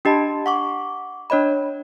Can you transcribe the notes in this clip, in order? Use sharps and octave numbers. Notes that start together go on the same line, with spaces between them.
D4 G4 D#5 A5 B5
F#5 C#6 D6
D4 C#5 D#5 B5